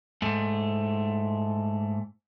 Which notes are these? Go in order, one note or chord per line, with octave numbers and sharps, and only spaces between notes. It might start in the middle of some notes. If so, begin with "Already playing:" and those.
G#2 A3